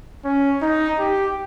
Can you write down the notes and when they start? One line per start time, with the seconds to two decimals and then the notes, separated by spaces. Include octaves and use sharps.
0.24 C#4
0.62 D#4
0.99 G4